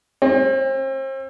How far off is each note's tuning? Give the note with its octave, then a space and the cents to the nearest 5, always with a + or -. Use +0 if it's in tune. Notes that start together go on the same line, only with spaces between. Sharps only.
C4 +40